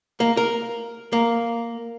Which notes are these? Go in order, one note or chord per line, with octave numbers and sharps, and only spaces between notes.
A#3
A#4
A#3